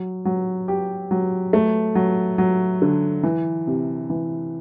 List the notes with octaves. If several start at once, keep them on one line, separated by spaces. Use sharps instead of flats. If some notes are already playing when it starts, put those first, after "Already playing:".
Already playing: F#3
F#3
G4
F#3
A3
F#3
F#3
D3
E3
C3
E3